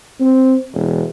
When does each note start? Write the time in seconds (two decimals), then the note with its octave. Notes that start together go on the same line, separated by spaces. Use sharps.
0.20 C4
0.73 E1